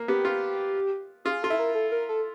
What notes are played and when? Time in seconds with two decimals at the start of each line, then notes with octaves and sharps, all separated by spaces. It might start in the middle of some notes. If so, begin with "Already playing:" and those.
Already playing: A#3
0.08 B3 G4
0.25 F4
1.25 F4 G#4
1.42 F4 A4
1.50 E4
1.59 A#4
1.75 A4
1.92 A#4
2.09 A4